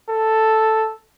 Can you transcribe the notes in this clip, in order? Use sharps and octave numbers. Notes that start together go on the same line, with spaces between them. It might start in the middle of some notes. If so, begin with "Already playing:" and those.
A4